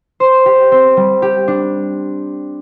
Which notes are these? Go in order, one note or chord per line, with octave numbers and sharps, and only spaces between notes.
C5
G4
C4
G3
G4
D4